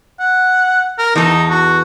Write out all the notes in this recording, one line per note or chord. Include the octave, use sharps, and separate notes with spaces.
F#5
A#4
E2 D#4 A4
F#4